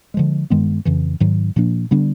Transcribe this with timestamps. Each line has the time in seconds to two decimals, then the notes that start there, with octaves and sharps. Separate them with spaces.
0.14 D3 F3 G#3
0.50 G2 D#3 G#3 B3
0.85 F2 C#3 E3
1.20 G#2 D#3 F#3
1.56 A#2 F3 A#3 D4
1.91 D3 G3 B3 D4